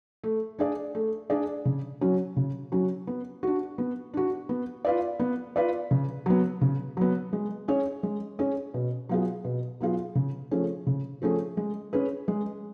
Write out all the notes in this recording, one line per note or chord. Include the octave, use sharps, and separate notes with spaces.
A3
D4 G#4 D5
A3
D4 G#4 D5
C#3
F#3 C#4 F#4
C#3
F#3 C#4 F#4
B3
D4 F#4
B3
D4 F#4
B3
F4 B4 D5
B3
F4 B4 D5
C#3
F#3 B3
C#3
F#3 B3
G#3
C#4 G#4 C#5
G#3
C#4 G#4 C#5
B2
F#3 B3 F4 G#4
B2
F#3 B3 F4 G#4
C#3
F3 A3 C#4 G#4
C#3
F3 A3 C#4 G#4
G#3
C#4 G#4 B4
G#3